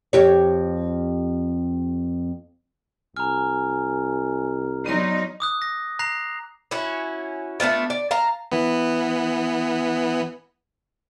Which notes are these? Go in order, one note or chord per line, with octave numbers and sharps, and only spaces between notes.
F2 G4 C#5
C2 G#5 A#5 F6
F#3 B3 D#4 D5 C6
D6 D#6 F#6
A#6
A#5 F#6 A#6 C7 F7
C#4 E4 F#4
A3 B3 D4 F4
D5
F5 A5 A#5
E3 B3